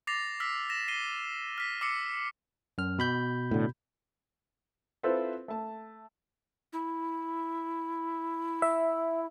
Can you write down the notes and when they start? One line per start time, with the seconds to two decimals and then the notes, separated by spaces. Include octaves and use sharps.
0.07 D6 A6 A#6 C7 F7
0.40 E6 F6 B6
0.70 A#6 E7
0.88 C7 D#7 G7
1.58 F6 B6
1.81 D6 E6 C7 C#7
2.78 F#2 F6
2.99 B2 B5 G6
3.51 A2 D3
5.03 C4 E4 F4 A4 B4 C5
5.48 A3 A5
6.73 E4
8.62 E5